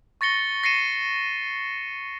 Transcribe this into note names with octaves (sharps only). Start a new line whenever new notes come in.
C#6 A6 A#6 C#7 G7
A#6 C7 C#7 D#7 E7